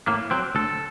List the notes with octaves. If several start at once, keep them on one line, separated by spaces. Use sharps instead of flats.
A2 A#3
F#3 C4
D2 A4